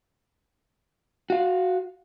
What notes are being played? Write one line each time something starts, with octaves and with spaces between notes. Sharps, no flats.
F#4 F5